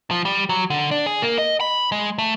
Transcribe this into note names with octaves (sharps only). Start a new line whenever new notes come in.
F3
G3
F#3
D3
D4
G#4
A#3
D#5
B5
G#3
A3